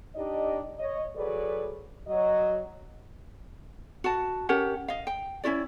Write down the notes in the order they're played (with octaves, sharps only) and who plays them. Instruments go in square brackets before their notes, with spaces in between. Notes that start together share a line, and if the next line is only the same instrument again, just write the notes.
[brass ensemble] D4 D#4 G4 D5 D#5
C#5 D#5
F#3 G#4 A4 B4 D5
F#3 D#5
[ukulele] F#4 A5
C#4 G4 A#4 F#5
D#5 F5
G5
C#4 E4 F#4 D5